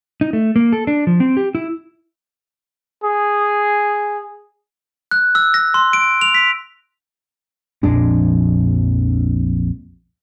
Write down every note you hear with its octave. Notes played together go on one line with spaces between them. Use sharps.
D#4
A3
A#3
A4
D4
F3
C4
G4
E4
G#4
F#6
E6
A#6
C6
D7
F7
B6
A#1 F2 G#3 D4